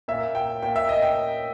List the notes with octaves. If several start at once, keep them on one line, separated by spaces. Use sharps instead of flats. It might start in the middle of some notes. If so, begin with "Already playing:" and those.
A#2 E5
G5
A#2 G5
E5
D#5
G5